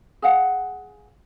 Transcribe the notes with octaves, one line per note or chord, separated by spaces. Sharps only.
G#4 F5 F#5